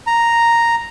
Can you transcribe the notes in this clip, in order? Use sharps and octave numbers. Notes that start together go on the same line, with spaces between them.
A#5